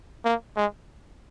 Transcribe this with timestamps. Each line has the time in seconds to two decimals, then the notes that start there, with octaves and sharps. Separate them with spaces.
0.25 A#3
0.56 G#3